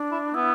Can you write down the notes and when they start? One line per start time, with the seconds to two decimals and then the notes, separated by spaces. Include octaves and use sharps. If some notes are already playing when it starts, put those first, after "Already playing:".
Already playing: D4
0.12 E4
0.34 B3 E4